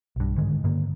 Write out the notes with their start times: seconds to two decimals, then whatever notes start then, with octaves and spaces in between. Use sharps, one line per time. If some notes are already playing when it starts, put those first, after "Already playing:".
0.16 B1 G2
0.37 G#2 D3 D#3 G#3
0.64 G2 D3 A#3